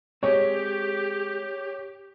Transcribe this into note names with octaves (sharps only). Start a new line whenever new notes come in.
G#3 C4 G4 C#5